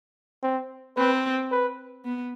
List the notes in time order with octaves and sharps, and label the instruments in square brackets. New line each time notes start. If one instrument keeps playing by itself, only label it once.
[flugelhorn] C4
[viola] C4 [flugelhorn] B4
[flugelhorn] B4
[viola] B3